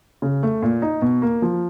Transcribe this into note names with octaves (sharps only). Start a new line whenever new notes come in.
C#3
A3
A#2
D#4
B2
A#3
F3